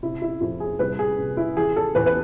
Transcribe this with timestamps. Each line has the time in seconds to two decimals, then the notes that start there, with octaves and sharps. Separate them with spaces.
0.03 C3 E4
0.22 E4
0.41 F2 E4
0.60 G#4
0.79 C2 B4
0.99 G#4
1.18 C3
1.37 E4
1.57 E3 G#4
1.76 A4
1.95 E2 B4
2.06 B4